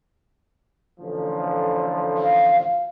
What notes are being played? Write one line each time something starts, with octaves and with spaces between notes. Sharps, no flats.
A1 D3 F3
F5